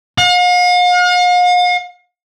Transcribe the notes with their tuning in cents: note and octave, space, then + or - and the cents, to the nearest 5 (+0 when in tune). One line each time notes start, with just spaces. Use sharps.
F5 +45